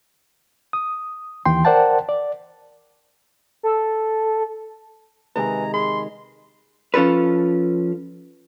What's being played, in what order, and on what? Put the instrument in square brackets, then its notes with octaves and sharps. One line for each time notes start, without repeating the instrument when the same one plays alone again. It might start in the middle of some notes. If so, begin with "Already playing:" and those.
[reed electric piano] D#6
D#2 E3 G5 C6
A#4 C5 D5 F#5 G5 A5
D5
[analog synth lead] A4
[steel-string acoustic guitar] C3 D#3 G#3 [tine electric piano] B4 G#5 [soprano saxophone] A#5
[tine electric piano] G#4 B5 [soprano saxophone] C6
[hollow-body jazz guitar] F3 C#4 F4 A4 B4